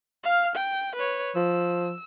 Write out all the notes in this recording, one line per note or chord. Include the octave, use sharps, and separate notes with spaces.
F5 F6
G5
B4 C#5
F3 E6